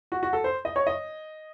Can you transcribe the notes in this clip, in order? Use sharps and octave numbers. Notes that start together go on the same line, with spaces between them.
F#4
F#4
A4
C5
D#5
C#5
D#5